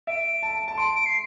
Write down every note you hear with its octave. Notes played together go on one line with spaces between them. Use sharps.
E5 D7
A5
A5
C6 D7
D7
C7